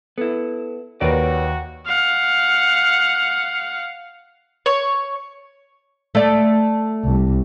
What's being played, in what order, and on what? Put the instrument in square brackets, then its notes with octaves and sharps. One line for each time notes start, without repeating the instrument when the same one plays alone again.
[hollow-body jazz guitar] B3 E4 [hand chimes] A4
[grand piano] D#2 [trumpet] F#4 [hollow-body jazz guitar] A#4 B4 D5 [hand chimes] C#5
[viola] F5 F#5
[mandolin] C#5
[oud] A3 D5
[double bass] C2